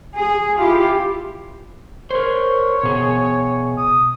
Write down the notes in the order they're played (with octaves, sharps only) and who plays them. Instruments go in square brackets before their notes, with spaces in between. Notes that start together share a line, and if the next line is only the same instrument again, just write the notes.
[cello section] G#4
E4 F4 G4
[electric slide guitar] A#4 C5 [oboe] C#5
[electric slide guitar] B2 G#4
[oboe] D#6